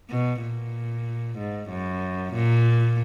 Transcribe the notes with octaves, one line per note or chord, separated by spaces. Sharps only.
B2
A#2
G#2
F#2
A#2